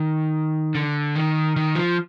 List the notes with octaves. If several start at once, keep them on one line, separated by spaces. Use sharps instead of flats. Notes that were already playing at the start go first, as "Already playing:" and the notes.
Already playing: D#3
D3
D#3
D#3
F3